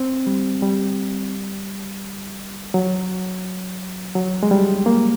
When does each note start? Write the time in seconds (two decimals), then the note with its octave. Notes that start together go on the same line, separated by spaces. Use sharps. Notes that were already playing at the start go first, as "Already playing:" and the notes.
Already playing: C4
0.27 G3
0.63 G3
2.74 F#3
4.15 F#3
4.43 G#3
4.51 G3
4.86 A#3